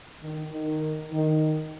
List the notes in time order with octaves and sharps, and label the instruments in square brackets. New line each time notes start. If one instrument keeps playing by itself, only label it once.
[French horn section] D#3
D#3
D#3